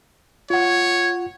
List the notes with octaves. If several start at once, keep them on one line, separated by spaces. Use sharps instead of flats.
F4 C#5 F#5